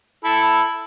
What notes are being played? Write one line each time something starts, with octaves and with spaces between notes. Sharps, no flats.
E4 A4